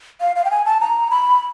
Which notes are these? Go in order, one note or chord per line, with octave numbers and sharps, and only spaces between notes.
F5
F5
G5
G#5
A5
A#5
B5